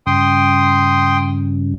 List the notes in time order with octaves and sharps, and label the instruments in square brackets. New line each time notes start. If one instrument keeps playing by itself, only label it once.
[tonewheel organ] G2 C#3 [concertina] G5 C6 D#6